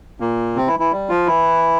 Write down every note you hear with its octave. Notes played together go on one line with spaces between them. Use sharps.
A#2 A#3
C3 C4
E3 E4
E3 E4
G3
F3 F4
E3 E4